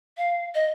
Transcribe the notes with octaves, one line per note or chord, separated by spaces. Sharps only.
F5
D#5